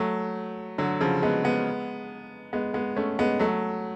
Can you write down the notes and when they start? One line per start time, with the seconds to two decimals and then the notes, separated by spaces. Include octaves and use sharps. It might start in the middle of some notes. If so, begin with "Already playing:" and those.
Already playing: F#3 A3
0.78 D3 F#3
1.01 C#3 F3
1.22 G#3 B3
1.44 G#3 B3
2.53 G#3 B3
2.74 G#3 B3
2.96 A3 C#4
3.19 G#3 B3
3.40 F#3 A3